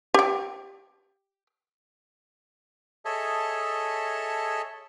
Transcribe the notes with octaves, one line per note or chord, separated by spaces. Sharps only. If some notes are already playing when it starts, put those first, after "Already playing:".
G4 G5
G#4 A4 C#5 D#5 E5 A5